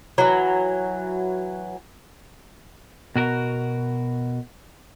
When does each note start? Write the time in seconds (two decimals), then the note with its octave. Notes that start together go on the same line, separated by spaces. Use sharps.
0.18 E3 F#3
3.16 B2 F#4 A#4